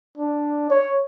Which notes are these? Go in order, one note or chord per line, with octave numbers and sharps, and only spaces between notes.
D4
C#5